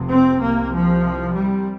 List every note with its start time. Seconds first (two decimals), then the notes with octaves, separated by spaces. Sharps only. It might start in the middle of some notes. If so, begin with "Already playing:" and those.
Already playing: F1 F2 C3
0.10 C4
0.41 C2 C3 A#3
0.72 F3
1.34 G3